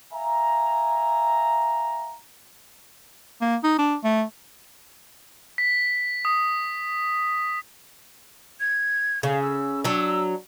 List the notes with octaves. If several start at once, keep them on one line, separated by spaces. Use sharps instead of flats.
E5 F5 G#5 A#5
A#3
D#4
D4
A3
B6
D#6
G#6
C#3 F5
E6
F#3 D4 E6